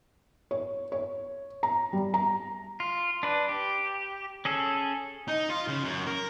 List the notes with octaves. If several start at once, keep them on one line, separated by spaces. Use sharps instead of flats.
C#5
C#5
A#5
G3
A#5
F4
D4 B4
G4
C#4 G#4 A4
D#4
F4
C#3
F#2
A#4